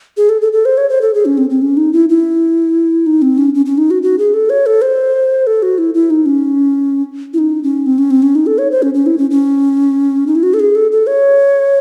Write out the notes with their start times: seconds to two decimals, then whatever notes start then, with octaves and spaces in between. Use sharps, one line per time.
0.17 G#4
0.29 A4
0.42 A4
0.53 A4
0.65 C5
0.78 C#5
0.89 C5
1.01 A4
1.14 G#4
1.25 C#4
1.38 C4
1.50 C4
1.62 C#4
1.77 D#4
1.93 E4
2.09 E4
3.06 D#4
3.22 C4
3.38 C#4
3.55 C#4
3.66 C#4
3.78 D#4
3.91 F#4
4.03 F#4
4.18 G#4
4.34 A4
4.50 C#5
4.66 A4
4.82 C5
5.47 A4
5.63 F#4
5.78 E4
5.94 E4
6.10 D#4
6.26 C#4
7.34 E4
7.38 D#4
7.63 C#4
7.86 C4
7.98 C#4
8.11 C4
8.22 C#4
8.35 D#4
8.46 A4
8.58 C#5
8.71 C5
8.82 C#4
8.94 C#4
9.06 E4
9.18 C#4
9.31 C#4
10.27 D#4
10.35 E4
10.43 F#4
10.54 A4
10.60 G#4
10.75 A4
10.92 A4
11.07 C#5